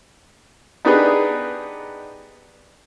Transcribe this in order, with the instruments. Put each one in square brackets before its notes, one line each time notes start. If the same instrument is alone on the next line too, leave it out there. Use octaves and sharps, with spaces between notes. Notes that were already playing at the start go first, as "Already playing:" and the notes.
[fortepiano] B3 D4 D#4 G4 G#4 B4